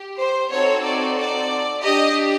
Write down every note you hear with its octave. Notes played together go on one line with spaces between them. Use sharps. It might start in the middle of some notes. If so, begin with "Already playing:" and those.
Already playing: G4
C5
C4 D#4 F#4 A4 C#5
D5
D5
D4 G4 D#5